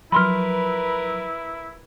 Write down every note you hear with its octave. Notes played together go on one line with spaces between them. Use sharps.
F3 F#3 E4 A#4 B4 B5 C6 F6